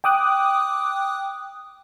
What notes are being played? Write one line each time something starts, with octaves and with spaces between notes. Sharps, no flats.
G5 D6 D#6 F#6